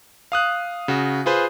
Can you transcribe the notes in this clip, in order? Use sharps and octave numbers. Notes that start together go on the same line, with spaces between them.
F5 D#6 F#6
C#3 F#4
F4 G#4 B4 C5